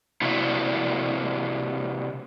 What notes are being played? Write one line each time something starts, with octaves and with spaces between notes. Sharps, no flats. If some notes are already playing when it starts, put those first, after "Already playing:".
C3 A#3 D4 E4 F#4